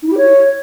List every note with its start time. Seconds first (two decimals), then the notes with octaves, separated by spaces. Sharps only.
0.02 D#4
0.07 E4
0.12 G4
0.17 C#5